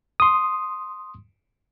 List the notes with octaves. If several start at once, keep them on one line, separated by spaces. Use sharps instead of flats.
C6 D#6